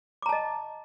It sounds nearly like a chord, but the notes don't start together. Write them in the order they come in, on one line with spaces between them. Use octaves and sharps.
D6 A#5 A5 D#5